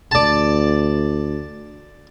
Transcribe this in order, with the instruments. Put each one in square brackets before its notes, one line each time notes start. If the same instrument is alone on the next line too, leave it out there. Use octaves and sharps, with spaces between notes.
[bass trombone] D2 [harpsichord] D5 A5